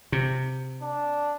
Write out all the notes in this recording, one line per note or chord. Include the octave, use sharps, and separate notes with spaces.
C3
D4